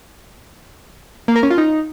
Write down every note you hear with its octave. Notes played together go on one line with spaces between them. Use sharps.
A#3
A#4
C#4
F4
D#4